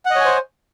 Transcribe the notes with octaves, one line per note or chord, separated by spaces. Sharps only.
C5 C#5 D#5 F#5 G#5